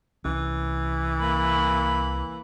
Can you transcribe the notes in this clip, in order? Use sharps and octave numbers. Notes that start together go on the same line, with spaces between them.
C2 E3 C#4
A#3 B5